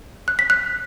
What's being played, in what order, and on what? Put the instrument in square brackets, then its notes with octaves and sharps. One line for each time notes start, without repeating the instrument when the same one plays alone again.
[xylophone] F#6
B6
F#6